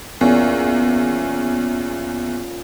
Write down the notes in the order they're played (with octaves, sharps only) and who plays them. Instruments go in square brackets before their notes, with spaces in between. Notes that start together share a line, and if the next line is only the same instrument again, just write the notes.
[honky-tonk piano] E2 [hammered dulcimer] A#2 C#4